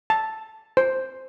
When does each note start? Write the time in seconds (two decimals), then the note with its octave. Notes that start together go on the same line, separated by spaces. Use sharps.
0.10 A5
0.77 C5